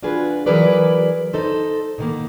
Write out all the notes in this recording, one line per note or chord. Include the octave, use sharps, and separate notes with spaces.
D4 F4 F#4 G#4 B4
E3 F#3 G#4 A#4 B4 D5
D#4 A4 C5
B2 D#3 A#3